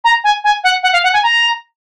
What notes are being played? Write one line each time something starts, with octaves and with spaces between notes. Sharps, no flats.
A#5
G#5
G#5
F#5
F#5
F5
F#5
G#5
A#5